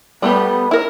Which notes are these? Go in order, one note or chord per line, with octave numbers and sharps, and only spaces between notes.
G3 A3 B3 G4
E4 A#4